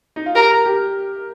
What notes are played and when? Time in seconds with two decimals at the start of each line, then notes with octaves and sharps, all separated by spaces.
0.16 D#4
0.26 F4
0.35 G4 A#4
0.51 A#4
0.65 G4